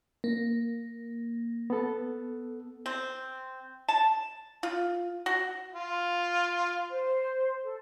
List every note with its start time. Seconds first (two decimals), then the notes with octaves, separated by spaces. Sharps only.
0.24 A#3
1.70 B3 A4
2.86 C4
3.88 A5
4.63 F4
5.26 F#4
5.74 F4
6.91 C5
7.63 A4